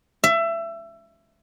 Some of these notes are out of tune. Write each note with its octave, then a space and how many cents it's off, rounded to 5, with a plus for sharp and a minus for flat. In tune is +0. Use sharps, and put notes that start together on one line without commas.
E5 +25